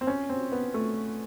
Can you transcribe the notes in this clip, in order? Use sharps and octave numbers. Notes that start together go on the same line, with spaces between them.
C4
C#4
C4
B3
A3